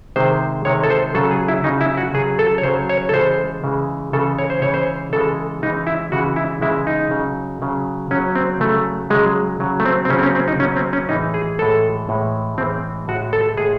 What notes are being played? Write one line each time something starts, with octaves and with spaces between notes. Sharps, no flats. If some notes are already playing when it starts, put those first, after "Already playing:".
C3 D#3 G#3 C5
C3 D#3 G#3 C#5
A4
C5
C#3 F#3 A4
G#4
E4
C#3 F#3 D#4
E4
F#4
C#3 F#3 G#4
A4
C#5
C#3 F#3 C5
C#5
A4
C#3 E3 G#3 C5
C#3 E3 G#3
C#3 E3 G#3 A4
C#5
C5
C#3 E3 G#3 C#5
C5
C#3 E3 G#3 A4
C#3 E3 G#3 D#4
E4
C#3 E3 G#3 F#4
E4
C#3 E3 G#3 E4
D#4
C#3 F#3
C#3 F#3
C#3 F#3 C#4
C4
C#3 F#3 A3
C#3 F#3 G#3
C#3 F#3
A3
C4
C4
C#3 F#3 C#4
C4
C#4
C4
D#4
C#3 F#3 C#4
C4
C#4
A2 E3 G#3 D#4
G#4
A2 E3 G#3 A4
A2 E3 G#3
A2 E3 G#3 C4
A2 G#3 F#4
A4
A2 G#3 G#4